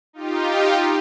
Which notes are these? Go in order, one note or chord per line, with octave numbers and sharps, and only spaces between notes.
D#4 F4 G4